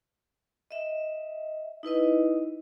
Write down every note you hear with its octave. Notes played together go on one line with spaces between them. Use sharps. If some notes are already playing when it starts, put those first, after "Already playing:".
D#5 E5
D#4 E4 B4 D#5